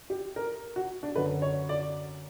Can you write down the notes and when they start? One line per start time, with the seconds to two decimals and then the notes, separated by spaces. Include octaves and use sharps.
0.10 G4
0.36 A#4
0.76 F#4
1.03 D4
1.16 F#2 D3 F#3 B4
1.42 C#5
1.69 D5